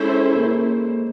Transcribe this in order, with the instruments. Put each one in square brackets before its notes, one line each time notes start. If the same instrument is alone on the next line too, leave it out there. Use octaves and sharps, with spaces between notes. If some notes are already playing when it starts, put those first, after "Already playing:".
Already playing: [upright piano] G#3 [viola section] C#4 E4 A4 C5
[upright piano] A#3